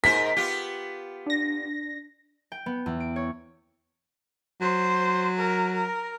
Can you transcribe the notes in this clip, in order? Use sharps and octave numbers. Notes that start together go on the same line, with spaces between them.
G#2 A#4 C5 B6
B3 F4 G4
D4 A#6
G5
B3
E2
D7
C#5
F#3 C5
A#4
A#4